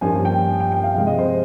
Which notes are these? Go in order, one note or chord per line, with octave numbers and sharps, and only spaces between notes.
G2 F3 A#3 C#4 G#5
G5
G5
G5
F5
C3 F3 G#3 F5
D#5
C5